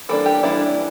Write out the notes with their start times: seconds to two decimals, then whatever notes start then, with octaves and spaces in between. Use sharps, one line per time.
0.09 E3 G3 A#3 D4 A4
0.26 G4
0.43 E3 G3 A#3 D4 E4